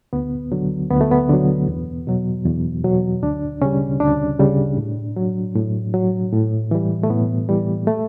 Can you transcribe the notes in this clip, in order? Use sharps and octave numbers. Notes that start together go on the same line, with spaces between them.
D2 B3
D3 F#3
D2 B3
A3
B3
D3 F#3
E2
B2 F#3
E2
B2 F#3
D2 D4
C#3 G3 C#4
D2 D4
C#3 G3
A2
F#3
A2
F#3
A2
E3 G3
A3
A2 B3
E3 G3
A3